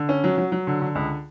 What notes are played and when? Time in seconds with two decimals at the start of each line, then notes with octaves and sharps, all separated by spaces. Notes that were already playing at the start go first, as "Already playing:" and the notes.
Already playing: D3
0.09 C#4
0.24 F#3
0.38 F#3
0.52 F#3
0.67 D3
0.82 D3
0.95 C#2